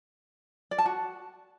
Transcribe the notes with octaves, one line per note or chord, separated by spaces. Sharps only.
D5
A5
F#4